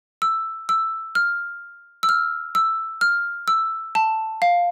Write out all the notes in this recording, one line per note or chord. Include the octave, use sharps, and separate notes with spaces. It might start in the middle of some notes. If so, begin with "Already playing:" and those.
E6
E6
F6
E6
F6
E6
F6
E6
A5
F5